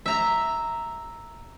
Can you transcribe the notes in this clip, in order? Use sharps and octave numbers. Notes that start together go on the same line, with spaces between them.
E5 A#5